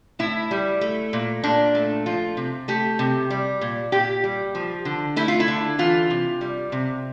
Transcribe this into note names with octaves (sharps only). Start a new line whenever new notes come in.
A2 E4
G3
A3
A#2
A#2 D4
A3
F3 F4
C3
A3 G4
C3
G3
A#2
A#2 G4
G3
F3
D3
A3 E4
F4
E4
D3
E3 F4
C3
G3
C3